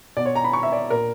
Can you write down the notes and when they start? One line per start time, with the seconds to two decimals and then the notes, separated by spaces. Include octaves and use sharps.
0.17 B2 D5
0.25 C#5
0.35 A#5
0.44 B5
0.53 C#6
0.63 E5
0.72 D5
0.90 A#2 A#4